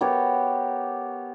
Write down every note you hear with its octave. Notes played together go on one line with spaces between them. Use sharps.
B3 G4 A#4 C#5